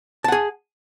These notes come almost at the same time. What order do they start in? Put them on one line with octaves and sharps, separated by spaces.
A5 F#5 G#4